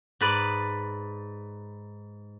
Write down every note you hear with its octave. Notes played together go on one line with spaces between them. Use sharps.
G#2 B4 D5